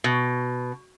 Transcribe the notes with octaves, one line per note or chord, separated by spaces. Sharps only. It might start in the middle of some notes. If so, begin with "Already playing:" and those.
B2